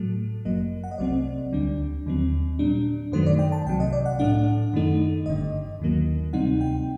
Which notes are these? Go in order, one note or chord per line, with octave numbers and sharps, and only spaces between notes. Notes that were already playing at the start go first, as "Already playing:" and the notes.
Already playing: A2 F#3 A3
G1 F#2 F#3 A#3 D#5
F#5
D#5
C2 C3 F#3 A3 C4 D5
D2 D3 G3 D4
D#2 D3 F#3 C4
A#2 G3 D4
F#2 D#3 F#3 A3 C5
D5
G5
A5
C2 C3 F#3 G5
D#5
D5
F#5
A2 A3 D4 F#5
F#2 D#3 A3 D#4
G1 G2 D3 D#5
D#2 D#3 F#3 A#3
D2 C3 G3 C4 D#4 F#5
G5